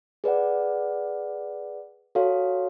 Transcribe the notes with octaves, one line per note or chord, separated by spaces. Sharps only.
G#4 B4 D5 F#5
F#4 A4 C#5 F5